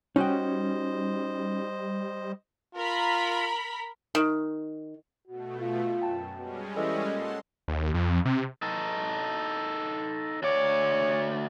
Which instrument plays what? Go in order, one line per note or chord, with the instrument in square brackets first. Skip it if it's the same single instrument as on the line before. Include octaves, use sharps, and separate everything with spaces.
[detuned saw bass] G3 [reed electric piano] C#4 [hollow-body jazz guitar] D#4 F#4 G5 [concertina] C5 D#5
[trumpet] F4 [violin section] A#4 B5
[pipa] D#3
[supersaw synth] B2 A3 [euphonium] F#4
[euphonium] F4
[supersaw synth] F#2 [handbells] G5 A5
[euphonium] B2 [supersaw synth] G3 G#3 C#4
[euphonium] E3 [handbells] A4 D#5
[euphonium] A#2 [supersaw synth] F#5 A5 C6
[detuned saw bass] D#2
F2
C3
[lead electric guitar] D#4 A4
[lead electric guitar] D2 D5 [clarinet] C#5